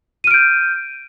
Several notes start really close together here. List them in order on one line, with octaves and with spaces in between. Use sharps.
D#7 F6 D7 G6